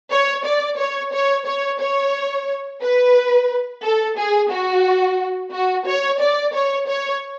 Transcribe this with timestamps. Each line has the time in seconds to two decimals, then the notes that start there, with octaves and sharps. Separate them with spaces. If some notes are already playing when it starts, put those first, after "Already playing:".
0.10 C#5
0.45 D5
0.78 C#5
1.13 C#5
1.47 C#5
1.80 C#5
2.81 B4
3.83 A4
4.17 G#4
4.51 F#4
5.53 F#4
5.87 C#5
6.21 D5
6.54 C#5
6.88 C#5